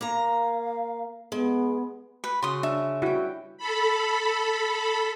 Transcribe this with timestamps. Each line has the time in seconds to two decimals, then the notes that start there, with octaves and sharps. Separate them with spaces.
0.01 A#3 F5 A#5
1.32 G#3 B3
2.24 B4
2.42 C#3 F#4 B5 C6 D#6
2.63 D4 E5
3.02 G3 E4 F#4 G5
3.58 A4 B5